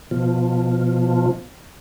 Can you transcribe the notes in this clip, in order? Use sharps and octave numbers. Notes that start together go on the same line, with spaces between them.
B2 F3